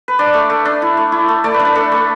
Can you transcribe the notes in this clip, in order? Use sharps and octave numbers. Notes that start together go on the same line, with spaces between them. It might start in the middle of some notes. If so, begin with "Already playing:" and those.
B4
D4 D5
A3
A3
D4
E4
A3
E4
A3
A3 D5
B4
D4
B4
D4 A4
A3